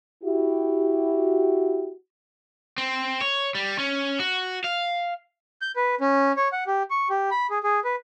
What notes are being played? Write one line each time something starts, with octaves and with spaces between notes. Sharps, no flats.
E4 F#4 G4
C4
C#5
G3
C#4
F#4
F5
G6
B4
C#4
C#5
F#5
G4
C#6
G4
B5
G#4
G#4
B4